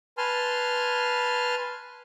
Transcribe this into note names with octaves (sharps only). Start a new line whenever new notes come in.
B4 G#5 A5 C6 F6